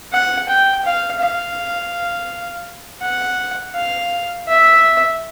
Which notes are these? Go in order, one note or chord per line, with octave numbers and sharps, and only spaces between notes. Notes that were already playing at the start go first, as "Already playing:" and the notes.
F#5
G5
F5
F5
F#5
F5
E5